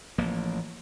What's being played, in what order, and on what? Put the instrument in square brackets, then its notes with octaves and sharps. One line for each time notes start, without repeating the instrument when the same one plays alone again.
[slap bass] A1 F3 A#3